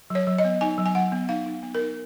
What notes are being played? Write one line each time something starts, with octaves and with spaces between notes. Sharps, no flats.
F#3 C#5
F#3
D#5
B3
D#4 G#5
F#3
G#5
F#3 F#5
B3
D#4 F5
D#4
B3
A#4
D#4